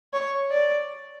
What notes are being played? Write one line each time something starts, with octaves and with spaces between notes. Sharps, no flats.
C#5
D5